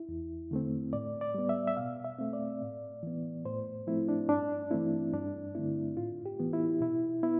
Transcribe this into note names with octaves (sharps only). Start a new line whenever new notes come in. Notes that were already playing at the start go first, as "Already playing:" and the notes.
Already playing: E4
E2
D3 A3 C4
A2 D5
D5
G3 B3
E5
E5
B2 F5
E5
A3 C4
D5
A2
E3 B3
A2 C5
F3 A3 C4 E4
D4
G2 D4
E3 A3 C4 E4
G2 D4
D3 A3 C4 E4
A2 F4
G4
E3 B3
E4
B2 E4
B3 E4